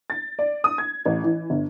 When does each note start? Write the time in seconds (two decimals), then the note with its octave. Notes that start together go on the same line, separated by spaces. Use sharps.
0.10 A6
0.39 D5
0.64 D#6
0.78 G#6
1.06 A1
1.23 E3
1.50 G1